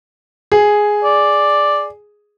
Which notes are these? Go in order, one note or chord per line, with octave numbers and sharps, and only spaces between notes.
G#4
D5